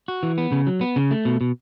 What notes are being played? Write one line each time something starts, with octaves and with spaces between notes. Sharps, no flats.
F#4
E3
B3
C#3
F#3
B3
C#3
A3
B2
B2